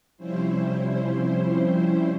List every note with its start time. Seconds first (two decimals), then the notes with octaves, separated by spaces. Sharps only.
0.17 C3 F3 G3 C#4 E4 C5